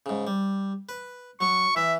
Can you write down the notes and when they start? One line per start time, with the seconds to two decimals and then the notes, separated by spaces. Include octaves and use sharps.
0.06 G#2 C#3
0.27 G3
0.89 B4
1.41 F#3 C#6
1.76 E3 E5